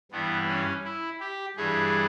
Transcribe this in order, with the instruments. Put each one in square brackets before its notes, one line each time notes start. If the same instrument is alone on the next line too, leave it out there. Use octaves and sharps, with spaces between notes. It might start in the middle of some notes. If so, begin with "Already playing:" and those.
[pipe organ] G2 E3 G3 B3
C#4
E4
G4
G2 E3 G3 G#4